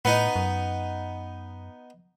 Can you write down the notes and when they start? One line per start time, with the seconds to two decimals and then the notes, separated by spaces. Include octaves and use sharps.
0.05 A2 B3 D#4
0.36 F#2